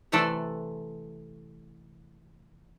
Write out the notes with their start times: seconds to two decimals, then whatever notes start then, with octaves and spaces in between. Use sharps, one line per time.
0.12 C3 E3 A3 A4 B4 D5